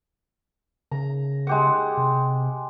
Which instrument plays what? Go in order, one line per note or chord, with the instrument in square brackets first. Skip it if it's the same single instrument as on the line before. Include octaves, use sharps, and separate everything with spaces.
[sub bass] C#3 [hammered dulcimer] A#5
[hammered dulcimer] G#3 G4 F#5
[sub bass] C3